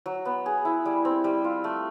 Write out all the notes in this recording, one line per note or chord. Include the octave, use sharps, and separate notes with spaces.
F#3
B3
G#4
E4
G3
C4
G3
F4
A3